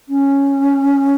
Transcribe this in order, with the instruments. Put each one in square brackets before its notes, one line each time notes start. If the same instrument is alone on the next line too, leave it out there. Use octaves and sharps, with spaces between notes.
[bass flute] C#4